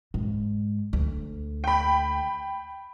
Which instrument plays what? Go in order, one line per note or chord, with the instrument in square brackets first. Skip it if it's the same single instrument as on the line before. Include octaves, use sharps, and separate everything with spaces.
[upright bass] G#2
D2
[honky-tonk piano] G5 B5